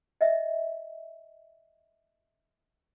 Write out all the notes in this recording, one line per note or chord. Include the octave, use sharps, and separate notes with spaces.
D#5 E5